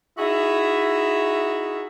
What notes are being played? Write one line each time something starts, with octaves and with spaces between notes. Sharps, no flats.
D#4 E4 F#4 G#4 E5